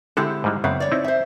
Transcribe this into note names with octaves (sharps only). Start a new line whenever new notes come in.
D3 G#3 C4 E4 G4 A4
G#2 G3 G#3
F#2 C#3 B3 C4
C#5 D5
C4 D#4 E4
C5 E5